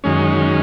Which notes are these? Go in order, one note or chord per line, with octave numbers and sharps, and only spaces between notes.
F#2 D#3 G#3 C#4